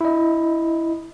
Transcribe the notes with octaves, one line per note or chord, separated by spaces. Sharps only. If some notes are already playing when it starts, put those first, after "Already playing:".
E4 D#5